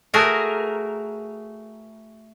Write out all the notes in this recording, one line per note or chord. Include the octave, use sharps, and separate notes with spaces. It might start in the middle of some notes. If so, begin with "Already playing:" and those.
A3 F#4 G#4 A#4